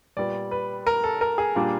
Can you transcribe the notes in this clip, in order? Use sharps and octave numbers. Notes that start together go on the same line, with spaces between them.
A#2 G3 B3 D5
B4
A#4
A4
A#4
G#4
A#2 G3 A#3 D4 F4